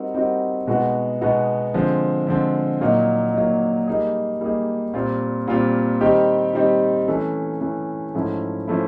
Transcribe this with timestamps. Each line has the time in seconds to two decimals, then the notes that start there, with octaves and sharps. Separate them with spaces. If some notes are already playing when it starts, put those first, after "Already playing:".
Already playing: G3 C4 D#4 F#4 A#4
0.15 G3 C4 D#4 F#4 A#4
0.67 B2 G#3 B3 D#4 F#4
1.21 B2 G#3 B3 D#4 F#4
1.74 D3 F3 G#3 C4
2.27 D3 F3 G#3 C4
2.81 A#2 F#3 A#3 D#4
3.34 A#2 F#3 A#3 D#4
3.87 G3 A#3 D#4 G#4
4.41 G3 A#3 D#4 G#4
4.94 A#2 G3 C4 F4
5.47 A#2 G3 C4 F4
6.01 D#3 G3 C4 D#4 G4
6.54 D#3 G3 C4 D#4 G4
7.08 E3 A3 C#4
7.61 E3 A3 C#4
8.14 G#2 F3 A3 C#4 E4
8.68 F3 A3 C#4 E4